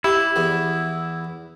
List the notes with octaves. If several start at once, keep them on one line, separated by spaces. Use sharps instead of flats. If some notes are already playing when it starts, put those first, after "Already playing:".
E4 G4
E2 B3